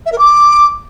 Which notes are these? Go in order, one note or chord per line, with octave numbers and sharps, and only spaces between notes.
E5
A#4
D6